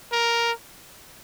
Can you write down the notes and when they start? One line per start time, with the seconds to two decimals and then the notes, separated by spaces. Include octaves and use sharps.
0.12 A#4